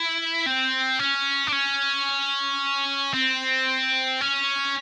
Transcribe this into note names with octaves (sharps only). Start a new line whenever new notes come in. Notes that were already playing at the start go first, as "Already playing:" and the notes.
Already playing: E4
C4
C#4
D4
C#4
C4
C#4